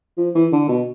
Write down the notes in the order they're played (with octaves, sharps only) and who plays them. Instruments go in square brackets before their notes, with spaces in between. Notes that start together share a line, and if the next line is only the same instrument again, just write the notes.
[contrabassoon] F3
E3
D3
B2